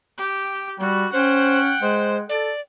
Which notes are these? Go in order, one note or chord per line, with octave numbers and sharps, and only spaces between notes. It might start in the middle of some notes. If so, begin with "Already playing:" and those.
G4
G3 F#4
C#4 C5 F#5 G5
G#3 C5
A4 D5